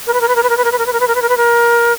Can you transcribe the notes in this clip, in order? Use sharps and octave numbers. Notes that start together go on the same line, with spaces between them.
A#4
B4
A#4
B4
A#4
B4
A#4
B4
A#4
B4
A#4
B4
A#4
B4
A#4
B4
A#4
B4
A#4